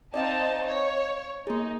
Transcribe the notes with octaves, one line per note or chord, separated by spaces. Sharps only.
C4 D#4 D5 D#5 F5 A5
C#5
A#3 D#4 G#4